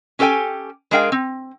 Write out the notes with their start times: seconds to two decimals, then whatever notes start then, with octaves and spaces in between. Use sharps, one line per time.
0.19 C#4 G4 A4 B4 G5 G#5
0.91 G#3 D4 G#4 A#4 F5 G5
1.12 C4